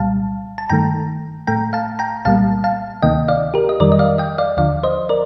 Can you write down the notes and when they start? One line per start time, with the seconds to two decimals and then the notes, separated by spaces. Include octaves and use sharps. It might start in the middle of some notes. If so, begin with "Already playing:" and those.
Already playing: C2 A#2 G3 F5 A5
0.58 A5
0.69 G2 D#3 A3 G5 A#5
1.47 A2 A3 G5 A#5
1.73 F5 A5
1.99 G5 A#5
2.25 C2 A#2 G3 A#3 F5 A5
2.64 F5 A5
3.03 D2 C3 D#3 A#3 D#5 G5
3.28 D5 F5
3.54 G4 A#4
3.69 D#5
3.80 F2 D#3 G3 A#4 D5
3.92 D#5
3.99 D5 F5
4.18 D#5 G5
4.38 D5 F5
4.57 D#2 D3 F3 D5 F5
4.83 C5 D#5
5.09 A#4 D5